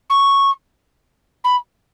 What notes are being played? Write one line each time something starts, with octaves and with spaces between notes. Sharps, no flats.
C#6
B5